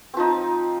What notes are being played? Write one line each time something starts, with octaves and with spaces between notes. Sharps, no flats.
F3 C4 D#4